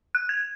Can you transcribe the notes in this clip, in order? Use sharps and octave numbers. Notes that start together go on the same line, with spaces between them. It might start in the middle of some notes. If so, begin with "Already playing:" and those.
F#6
G#6